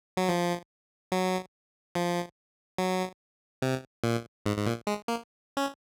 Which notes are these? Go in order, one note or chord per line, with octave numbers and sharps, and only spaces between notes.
F#3
F3
F#3
F3
F#3
C3
A#2
G#2
G#2
A#2
G#3
A#3
C#4